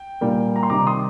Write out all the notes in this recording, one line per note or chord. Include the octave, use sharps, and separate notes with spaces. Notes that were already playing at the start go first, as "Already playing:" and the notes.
Already playing: G5
A#2 G3 A#3
A#5
C6
C3 D#3 G3 A#5 D6
C6 D#6